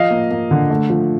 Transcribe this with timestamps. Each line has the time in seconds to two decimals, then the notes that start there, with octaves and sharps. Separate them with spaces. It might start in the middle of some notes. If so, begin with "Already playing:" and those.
Already playing: F3 D#5 F5
0.11 A#3
0.31 A#3
0.51 D3
0.70 A3
0.90 F3